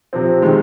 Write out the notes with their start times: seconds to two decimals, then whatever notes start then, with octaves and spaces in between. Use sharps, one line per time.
0.13 C3 F3 C4
0.42 C3 D#3 G#3